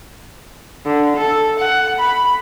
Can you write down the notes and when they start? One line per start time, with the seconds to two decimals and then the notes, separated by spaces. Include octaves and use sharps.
0.86 D3
1.16 A4
1.59 F#5
1.99 B5